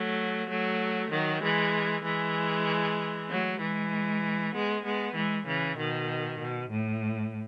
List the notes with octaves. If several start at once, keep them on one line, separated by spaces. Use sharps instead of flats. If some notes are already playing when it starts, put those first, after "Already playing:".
Already playing: F#3 A3
F#3 A3
D#3 F#3
E3 G#3
E3 G#3
F#3 A3
E3 G#3
G#3 B3
G#3 B3
E3 G#3
C#3 E3
B2 D#3
B2
A2